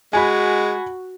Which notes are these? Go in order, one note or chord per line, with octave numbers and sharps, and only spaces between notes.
G#3 F#4 G#5 B5